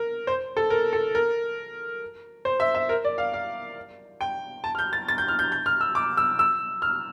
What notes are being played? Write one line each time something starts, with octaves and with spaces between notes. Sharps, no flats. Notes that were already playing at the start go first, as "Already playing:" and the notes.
Already playing: A#4
C5
A4
A#4
A4
A#4
C5
E5
E5
A#4
D5
F5
F5
G5
A5
F6
G6
A6
A6
G6
F6
G6
G6
F6
E6
D6
E6
E6
F6